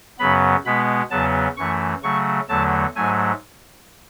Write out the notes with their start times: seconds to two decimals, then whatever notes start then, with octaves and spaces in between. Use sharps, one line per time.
0.19 F#2 C#3 F#3 B3 B5
0.65 B2 G#3 B3 B5
1.11 E2 C#3 F#3 B3 A5
1.57 F#2 E3 A3 C#6
2.03 C#3 F#3 A3 C#6
2.49 E2 D3 F#3 A3 A5
2.95 G#2 F#3 A3 G#5